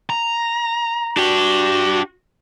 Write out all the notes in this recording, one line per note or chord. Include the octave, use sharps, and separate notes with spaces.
A#5
D4 F#4 G4